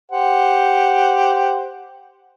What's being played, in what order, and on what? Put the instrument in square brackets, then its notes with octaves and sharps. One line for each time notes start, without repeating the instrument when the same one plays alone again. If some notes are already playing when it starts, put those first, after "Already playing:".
[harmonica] G4 C5 F#5